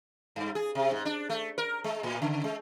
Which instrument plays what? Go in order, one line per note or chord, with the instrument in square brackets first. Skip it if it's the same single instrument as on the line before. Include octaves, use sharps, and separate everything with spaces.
[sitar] G2
G#4
C3
G#2
D4
A3
A#4
G#3
A2
C#3
G#3